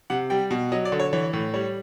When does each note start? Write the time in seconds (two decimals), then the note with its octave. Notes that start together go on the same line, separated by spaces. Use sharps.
0.10 C3 F#5
0.30 G3 G5
0.51 B2
0.72 F#3 D#5
0.85 D5
0.92 D3
0.99 C#5
1.13 E3 C#5
1.33 A2
1.54 G3 C#5